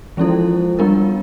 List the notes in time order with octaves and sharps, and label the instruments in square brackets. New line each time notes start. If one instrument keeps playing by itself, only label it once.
[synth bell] E3 G#3 C#4 E4 A4 [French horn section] F3
[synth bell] G3 B3 D4 F4 A#4